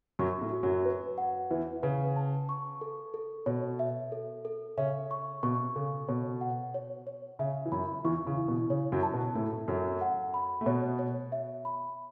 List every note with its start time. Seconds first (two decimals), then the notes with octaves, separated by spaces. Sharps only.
0.19 F#2 F#3 C#6
0.41 A2 A3
0.52 F#4
0.63 F#2 F#3
0.85 B4
1.18 F#5
1.51 E2 E3 B4
1.82 C#3 B4
2.16 A5
2.49 C#6
2.81 A4
3.14 A4
3.46 B2 C#5
3.79 E5
4.12 A4
4.45 A4
4.78 C#3 C#4 E5
5.11 C#6
5.43 B2 C#6
5.76 C#3 A4
6.08 B2 C#5
6.41 F#5
6.74 C#5
7.07 C#5
7.39 C#3 E5
7.66 E3
7.72 F#2 F#3 B5
8.05 E2 E3 C#6
8.27 C#3
8.37 E4
8.48 B2
8.70 C#3 C#5
8.92 F#2 F#3
9.03 A5
9.14 B2 B3
9.35 A2 A3 A4
9.68 F#2 F#3 A4
10.01 F#5
10.34 B5
10.61 A3
10.66 B2 B3 C#5
10.99 C#5
11.32 E5
11.65 B5